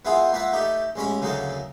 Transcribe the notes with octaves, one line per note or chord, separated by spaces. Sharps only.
B3 E4 F4 G#4 A#4 C5
A#3 F4 B4 E5 F#5
A3 D#4 G4 A4
A1 G#3 C#4 C#5 B5
D2 C#3 F#3 A#3 D#4 A4